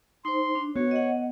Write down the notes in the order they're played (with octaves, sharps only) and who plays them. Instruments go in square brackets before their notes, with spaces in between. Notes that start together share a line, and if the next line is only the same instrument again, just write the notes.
[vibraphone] D#4 C5 [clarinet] C6
[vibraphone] D4
[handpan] B3 [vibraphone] F#4 [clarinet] C#5
[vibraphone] D#5 F#5